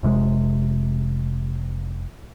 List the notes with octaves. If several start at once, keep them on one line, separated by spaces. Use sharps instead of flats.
F1 C3 G#3